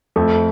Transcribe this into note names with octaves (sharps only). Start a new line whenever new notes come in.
F2 A3